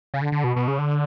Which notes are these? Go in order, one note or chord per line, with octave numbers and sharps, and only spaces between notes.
C#3
D3
D3
B2
B2
C#3
D3